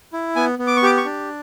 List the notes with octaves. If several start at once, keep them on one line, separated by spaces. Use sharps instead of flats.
E4
B3 G#5
B3
D6
C#6
G4 D6
C#6
D4